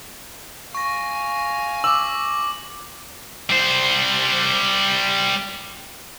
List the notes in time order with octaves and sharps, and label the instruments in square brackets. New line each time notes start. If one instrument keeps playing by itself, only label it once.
[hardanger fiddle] F5 G#5 [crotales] C#6 A#6
[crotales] D6 F#7 [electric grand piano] E6
[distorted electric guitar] G3 C5